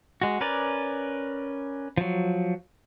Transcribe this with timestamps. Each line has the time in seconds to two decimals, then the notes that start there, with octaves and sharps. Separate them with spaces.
0.22 G#3 F#4
0.41 C#4 A#4 B4 D5
1.98 F3 F#3